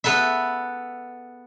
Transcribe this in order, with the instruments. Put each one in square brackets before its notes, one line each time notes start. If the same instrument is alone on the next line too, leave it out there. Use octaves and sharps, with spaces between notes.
[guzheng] B3 A4 B4 E5